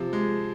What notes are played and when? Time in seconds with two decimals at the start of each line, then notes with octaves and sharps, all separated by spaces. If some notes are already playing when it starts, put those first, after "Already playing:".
Already playing: C3 F3
0.13 G#3